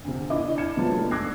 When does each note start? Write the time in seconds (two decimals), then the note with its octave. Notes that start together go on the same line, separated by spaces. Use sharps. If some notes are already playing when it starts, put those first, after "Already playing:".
0.04 D2 C3
0.30 D4 E4 D#5 D6
0.58 F6 G#6 C#7 E7
0.77 C3 F#3 G#3 B3 F4 A5
0.96 A3 D4 D#4
1.11 D6 E6 F#6 G#6 A#6 C7